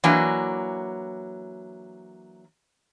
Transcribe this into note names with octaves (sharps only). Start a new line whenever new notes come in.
E3 F#3 A#3 D4 G#5